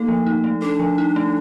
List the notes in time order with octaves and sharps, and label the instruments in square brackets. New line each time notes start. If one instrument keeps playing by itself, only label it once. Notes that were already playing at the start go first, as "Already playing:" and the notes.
Already playing: [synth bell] A3 D#4 A4 [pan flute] A#3
[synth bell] F3
D#4
A3
[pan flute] D4 [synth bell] A4
[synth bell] F3
D#4
A3